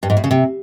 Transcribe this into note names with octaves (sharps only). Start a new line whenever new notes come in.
G2
G#2
A2
C#3
C3